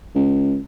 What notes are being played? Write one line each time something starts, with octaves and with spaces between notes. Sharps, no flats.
C#2